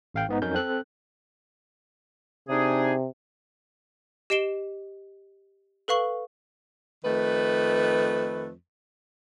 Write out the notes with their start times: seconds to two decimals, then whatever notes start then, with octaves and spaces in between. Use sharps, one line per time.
0.14 A1 F5 G5
0.29 G#2 B3 D#4
0.42 F2 F#3 C#4 D#4 A#4 G6
0.54 C4 A4 F#6
2.49 C3 D4 D#4 G#4
4.30 G4 D#5 C7 D7 E7 G7
5.88 A4 B4 F5 C#6 F#7
7.05 F2 D#3 A3 B4